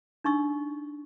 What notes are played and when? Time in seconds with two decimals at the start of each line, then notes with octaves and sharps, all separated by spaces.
0.24 D4 D#4 C#6 E6